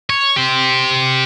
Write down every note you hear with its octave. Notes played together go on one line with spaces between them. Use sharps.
C#5
G4 C5